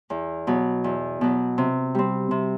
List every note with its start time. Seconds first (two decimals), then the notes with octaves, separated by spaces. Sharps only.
0.10 E2
0.47 B2 F#3
0.84 E2
1.21 B2 F#3
1.58 C3
1.95 G3 C4
2.31 C3